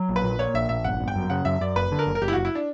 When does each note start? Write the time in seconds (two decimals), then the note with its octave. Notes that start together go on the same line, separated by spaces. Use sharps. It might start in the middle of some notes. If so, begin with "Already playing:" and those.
Already playing: F#3
0.09 A#1
0.16 B4
0.23 A#2
0.39 A#2 C#5
0.54 A#1 E5
0.69 A#1 E5
0.84 G1 F#5
1.00 G1
1.08 G5
1.16 F#2
1.30 C#3 F#5
1.45 F#2 E5
1.61 F#2 D5
1.76 F#1 B4
1.91 D3
1.99 A#4
2.07 F#1
2.15 A#4
2.22 F#1 G4
2.28 E4
2.33 F#1 F#4
2.45 E4
2.55 D4